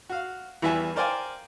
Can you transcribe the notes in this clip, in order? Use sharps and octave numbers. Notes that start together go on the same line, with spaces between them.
F#4 F5
E2 E3 G3 E4 E5 G#5
A#4 C5 D5 F5 G5 G#5